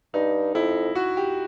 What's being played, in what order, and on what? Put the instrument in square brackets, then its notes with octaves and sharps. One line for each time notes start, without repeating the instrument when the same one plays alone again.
[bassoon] G2 [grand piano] D#4
[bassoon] F2 [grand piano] E4
[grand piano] F#4
G4